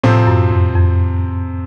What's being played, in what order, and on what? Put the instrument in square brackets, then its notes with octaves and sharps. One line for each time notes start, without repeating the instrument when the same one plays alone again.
[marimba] A2 [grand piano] C3 F3 C4
[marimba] F#2
F2
F2